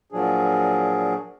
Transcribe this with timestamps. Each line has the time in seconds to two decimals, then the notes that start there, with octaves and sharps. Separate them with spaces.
0.12 A#2 F3 F#3 D4 G#4